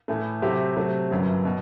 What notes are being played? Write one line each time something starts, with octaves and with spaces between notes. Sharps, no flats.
A2 E3 A3
C3 F#3 A3 C4 G4
C3 F#3 A3 C4
G1 F#2 F#3
B2